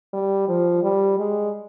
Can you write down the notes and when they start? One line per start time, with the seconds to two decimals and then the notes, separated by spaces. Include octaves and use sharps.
0.13 G3
0.48 F3
0.83 G3
1.18 G#3